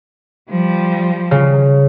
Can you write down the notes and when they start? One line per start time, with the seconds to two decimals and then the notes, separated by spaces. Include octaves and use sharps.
0.50 F3 G3
1.31 C#3